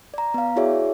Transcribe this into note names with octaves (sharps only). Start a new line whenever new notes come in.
D5 A#5
B3 F5
E4 F#4 G#4 C#5 D5 E5